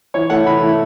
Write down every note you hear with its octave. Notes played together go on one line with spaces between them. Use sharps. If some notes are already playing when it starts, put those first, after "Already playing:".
E3 C#5
A3 E4 F#5
E3 B5
A3 E4